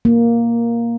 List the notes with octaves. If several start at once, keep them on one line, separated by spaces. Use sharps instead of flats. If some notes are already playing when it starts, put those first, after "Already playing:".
A#3